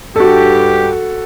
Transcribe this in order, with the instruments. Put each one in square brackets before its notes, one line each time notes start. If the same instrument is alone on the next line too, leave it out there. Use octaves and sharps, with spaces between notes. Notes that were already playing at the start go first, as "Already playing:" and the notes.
[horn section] G2 G4 [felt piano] F#4 A4